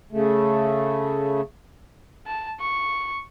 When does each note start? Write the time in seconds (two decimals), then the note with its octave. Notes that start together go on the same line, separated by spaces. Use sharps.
0.12 C#3 A3
2.27 A5
2.60 C#6